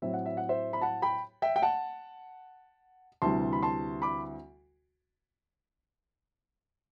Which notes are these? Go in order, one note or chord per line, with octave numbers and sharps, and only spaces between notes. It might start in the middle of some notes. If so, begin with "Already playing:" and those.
A2 F#3 C4 E4 E5
F#5
E5
F#5
C5 E5
B5
F#5 A5
G5 B5
E5 G5
G5
F#5 A5
D2 C3 E3 G3 A5 C6
B5
A5 C6
B5 D6